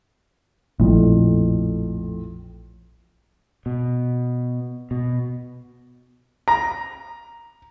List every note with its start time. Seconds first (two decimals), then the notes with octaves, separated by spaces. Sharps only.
0.80 A#1 F2 A2
3.66 B2
4.91 B2
6.48 A#5